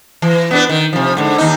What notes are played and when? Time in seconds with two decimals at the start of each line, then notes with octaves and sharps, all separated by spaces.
0.22 E3
0.51 B3 D4 B4
0.69 D#3
0.93 C3 F3
1.17 G#2 D3
1.38 D#2 D#4